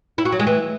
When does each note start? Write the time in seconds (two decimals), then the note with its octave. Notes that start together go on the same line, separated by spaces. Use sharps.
0.18 E4
0.25 F#4
0.32 F#3
0.40 G#3
0.47 E3